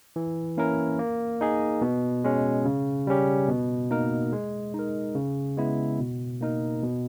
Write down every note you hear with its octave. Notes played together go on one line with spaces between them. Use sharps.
E3
A#3 C#4 E4 A#4
A#3
D#4 G#4
B2
G#3 C#4
C#3
G3 C#4 G4
B2
A#3 D#4 A#4
G#3
D#4 A#4
C#3
G#3 B3 E4
B2
A#3 D#4 A#4
B2